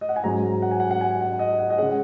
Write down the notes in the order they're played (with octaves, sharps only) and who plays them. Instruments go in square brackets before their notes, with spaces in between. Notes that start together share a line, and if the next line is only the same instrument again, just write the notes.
[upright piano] D#5
F#5
G#5
G#2 F#3 C#4 A#5
F#5
G#5
F#5
F#5
G#5
F#5
D#5
F#5
D#5
C#3 G#3 C#4 F#5